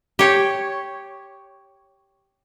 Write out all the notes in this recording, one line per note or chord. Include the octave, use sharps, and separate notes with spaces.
G4 C#5